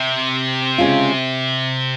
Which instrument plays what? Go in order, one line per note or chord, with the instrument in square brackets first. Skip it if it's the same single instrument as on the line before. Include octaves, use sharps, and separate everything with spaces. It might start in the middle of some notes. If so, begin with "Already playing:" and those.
Already playing: [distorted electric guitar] C3
[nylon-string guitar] C#3 G#3 C#4 F4